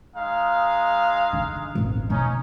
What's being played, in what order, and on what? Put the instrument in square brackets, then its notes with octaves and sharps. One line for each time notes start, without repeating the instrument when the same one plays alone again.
[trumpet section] G#3 D#4 F5
[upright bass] D3
D#1 G#1
[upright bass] D2 B2 [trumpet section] C#4 D#4